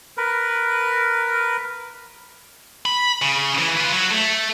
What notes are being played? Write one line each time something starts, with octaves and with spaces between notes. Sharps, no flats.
A#4 B4
B5
C#3
E3
F4 B4
F#3
A3